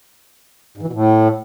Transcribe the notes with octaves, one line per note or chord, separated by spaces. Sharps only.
G#2
E3
B2
A2